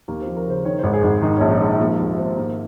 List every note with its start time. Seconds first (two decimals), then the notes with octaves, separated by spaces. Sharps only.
0.08 D#2 A#3
0.21 F3 C4
0.37 A#4
0.46 C#3 C5
0.65 D#3 C#5
0.79 G#1 C5
0.93 G#4
1.04 G#1
1.22 D#3 D#4
1.37 A#1 C#4
1.51 D#4
1.60 G#2
1.65 C#4
1.80 F3 A#3
1.99 D#2 C4
2.18 D#2 C4
2.36 G#2 A#3